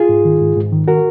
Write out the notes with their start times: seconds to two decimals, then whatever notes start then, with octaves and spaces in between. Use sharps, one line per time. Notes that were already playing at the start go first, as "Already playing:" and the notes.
Already playing: F4 G#4
0.09 G#2
0.25 D#3
0.41 G#2
0.56 G#2
0.72 D#3
0.88 F#4 A#4